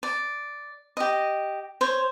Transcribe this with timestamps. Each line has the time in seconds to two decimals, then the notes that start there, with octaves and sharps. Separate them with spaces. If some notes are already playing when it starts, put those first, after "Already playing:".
0.03 D5
0.97 G4 D#5
1.81 C5 C#5